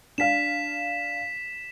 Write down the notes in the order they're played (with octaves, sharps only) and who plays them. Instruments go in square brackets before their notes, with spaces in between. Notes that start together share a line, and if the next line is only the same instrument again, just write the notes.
[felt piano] D4 F5 [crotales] B6 E7